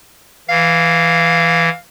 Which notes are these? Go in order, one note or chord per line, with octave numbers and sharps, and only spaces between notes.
E3 F5